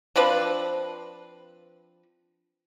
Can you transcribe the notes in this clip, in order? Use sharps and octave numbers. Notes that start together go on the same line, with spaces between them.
F3 C4 D4 B4